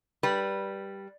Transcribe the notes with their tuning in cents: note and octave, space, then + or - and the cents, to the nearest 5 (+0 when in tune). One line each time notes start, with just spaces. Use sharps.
G3 +0 B4 -20